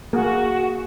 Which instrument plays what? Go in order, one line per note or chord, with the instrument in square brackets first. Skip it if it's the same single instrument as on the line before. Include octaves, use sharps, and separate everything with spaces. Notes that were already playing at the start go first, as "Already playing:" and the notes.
[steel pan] A#3 [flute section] F#4 [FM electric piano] G#4